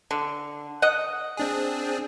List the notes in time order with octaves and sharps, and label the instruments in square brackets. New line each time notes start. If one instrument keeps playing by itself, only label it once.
[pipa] D3
D#5 F#5
[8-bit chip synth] C4 D4 G#4